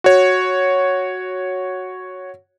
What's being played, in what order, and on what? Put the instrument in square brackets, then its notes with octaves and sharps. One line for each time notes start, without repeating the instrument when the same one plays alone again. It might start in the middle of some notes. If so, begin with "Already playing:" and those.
[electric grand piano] F#4 C#5